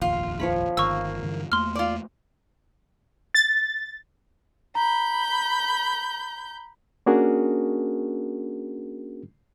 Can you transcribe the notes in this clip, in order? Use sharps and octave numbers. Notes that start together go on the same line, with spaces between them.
F1 A#1 D#2 F4
F3 C#5 B5
G1 D#3 A#3 C#6 E6
G2 D3 E3
E2 A3 A#3 C6 F6
F4 D5
A6
A#5 B5 G6
A#3 C#4 D4 F#4 G#4 A#4